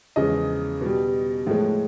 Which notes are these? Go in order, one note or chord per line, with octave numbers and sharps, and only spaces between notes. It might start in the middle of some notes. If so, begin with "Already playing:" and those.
E2 C#3 F3 G#3 D#5
B2 G3
A2 F3 G#3